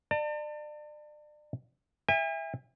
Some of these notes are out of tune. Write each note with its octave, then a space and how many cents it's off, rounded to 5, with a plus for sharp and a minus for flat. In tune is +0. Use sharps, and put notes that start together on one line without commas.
D5 +35 A5 +40
E5 +0 G#5 -45